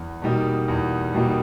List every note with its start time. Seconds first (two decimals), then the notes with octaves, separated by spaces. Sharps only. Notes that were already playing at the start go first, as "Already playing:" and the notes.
Already playing: E2
0.22 B2 G3 A#3 D#4
0.68 E2
1.13 B2 G3 A#3 D#4